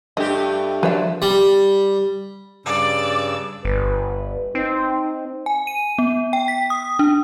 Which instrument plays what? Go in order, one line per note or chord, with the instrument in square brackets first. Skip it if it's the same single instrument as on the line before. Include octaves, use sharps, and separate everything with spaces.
[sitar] G2 G4 [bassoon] A3 [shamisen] D#5
[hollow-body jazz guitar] F3 F#3 D4 [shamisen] B4 C#5 E5
[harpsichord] G3
[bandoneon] G2 C#3 E6 [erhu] D5
[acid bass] G1 [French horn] B4
[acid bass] C4 [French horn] D#4
[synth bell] G#5
D#7
B3
G5
B6
D#6
D4